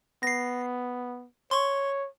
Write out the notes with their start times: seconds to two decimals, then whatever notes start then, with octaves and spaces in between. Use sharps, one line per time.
0.23 B3 A#6 C7
1.51 C#5 C6 C#6